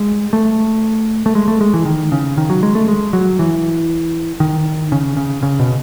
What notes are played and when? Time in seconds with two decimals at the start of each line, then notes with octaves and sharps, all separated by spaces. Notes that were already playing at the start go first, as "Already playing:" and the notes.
Already playing: G#3
0.33 A3
1.26 A3
1.35 G#3
1.48 A3
1.61 G#3
1.74 E3
1.86 D#3
2.12 C#3
2.38 D#3
2.50 F#3
2.63 G#3
2.75 A3
2.88 G#3
3.13 F#3
3.39 E3
4.40 D#3
4.92 C#3
5.17 C#3
5.43 C#3
5.59 B2